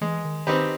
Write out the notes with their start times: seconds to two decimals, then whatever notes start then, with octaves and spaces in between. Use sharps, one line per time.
0.01 E3 G#3
0.25 D#3
0.47 D#3 C4 D#4 G4 B4